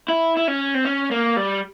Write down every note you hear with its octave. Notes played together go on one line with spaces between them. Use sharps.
E4
E4
C#4
C4
C#4
A#3
G3